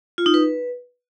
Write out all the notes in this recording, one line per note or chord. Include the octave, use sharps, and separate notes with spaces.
F4
D#4
B4